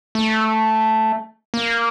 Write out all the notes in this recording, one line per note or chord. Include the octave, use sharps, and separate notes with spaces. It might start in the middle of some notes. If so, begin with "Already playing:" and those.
A3
A#3